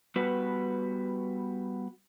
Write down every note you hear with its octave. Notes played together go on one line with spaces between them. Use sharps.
G3 B3 F#4 B4